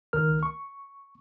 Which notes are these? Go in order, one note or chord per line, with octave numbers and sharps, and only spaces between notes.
C#2 D#3 A#4 F6
C#6